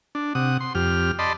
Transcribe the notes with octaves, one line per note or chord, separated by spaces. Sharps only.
D4
C3 F#5 D#6
C6
F2 G4 F6
D5 D#5 A5 B5 C6